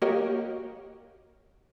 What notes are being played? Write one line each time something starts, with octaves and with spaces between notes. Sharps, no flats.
A#3 F#4 G4 A#4 C#5 D#5